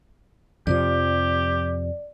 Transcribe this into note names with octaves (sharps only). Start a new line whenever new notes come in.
F2 C3 F3 G4 D5